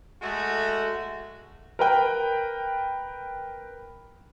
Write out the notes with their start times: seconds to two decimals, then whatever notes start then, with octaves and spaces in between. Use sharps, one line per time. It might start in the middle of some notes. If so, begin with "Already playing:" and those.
0.22 G#3 A3 F#4
1.79 A#4 B4 G5